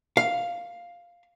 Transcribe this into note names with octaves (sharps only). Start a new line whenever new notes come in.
F5